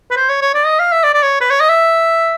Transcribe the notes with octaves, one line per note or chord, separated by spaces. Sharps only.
B4
C5
C#5
C#5
D5
D#5
F5
E5
D5
D5
C#5
B4
C#5
D#5
E5